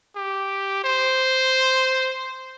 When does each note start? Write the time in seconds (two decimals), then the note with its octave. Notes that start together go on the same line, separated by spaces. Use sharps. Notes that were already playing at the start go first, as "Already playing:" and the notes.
0.16 G4
0.84 C5